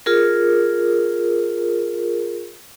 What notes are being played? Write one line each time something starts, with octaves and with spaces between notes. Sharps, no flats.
F4 G#4 A#4